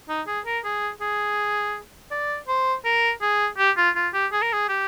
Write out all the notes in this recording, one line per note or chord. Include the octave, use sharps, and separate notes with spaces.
D#4
G#4
A#4
G#4
G#4
D5
C5
A#4
G#4
G4
F4
F4
G4
G#4
A#4
G#4
G4